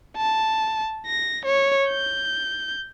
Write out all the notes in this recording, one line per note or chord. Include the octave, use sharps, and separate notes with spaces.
A5
A#6
C#5
G6